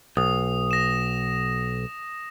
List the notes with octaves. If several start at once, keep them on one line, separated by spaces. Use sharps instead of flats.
B1 D#6
A#6 E7